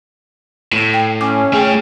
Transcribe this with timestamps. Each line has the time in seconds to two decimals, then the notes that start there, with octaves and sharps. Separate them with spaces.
0.73 A2
0.94 G5
1.21 C#4 D6
1.53 A3 G#4 G5